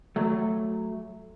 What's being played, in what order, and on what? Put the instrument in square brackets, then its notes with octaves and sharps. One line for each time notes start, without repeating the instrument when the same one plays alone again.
[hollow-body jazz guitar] F#3 A3